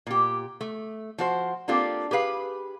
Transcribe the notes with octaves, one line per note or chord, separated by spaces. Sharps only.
A#2 G4
A3
F3 F#4 C5
A#3 C4 D4 F4 G4 A4
G4 G#4 B4 F5